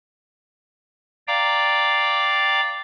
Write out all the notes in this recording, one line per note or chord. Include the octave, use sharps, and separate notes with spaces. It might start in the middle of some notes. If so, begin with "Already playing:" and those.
D5 F5 G5 A#5 D6